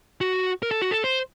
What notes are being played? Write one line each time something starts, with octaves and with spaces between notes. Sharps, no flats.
F#4
A#4
A4
F#4
A4
C5